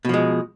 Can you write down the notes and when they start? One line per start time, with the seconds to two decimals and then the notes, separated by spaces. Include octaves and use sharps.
0.05 B2
0.09 F3
0.14 G#3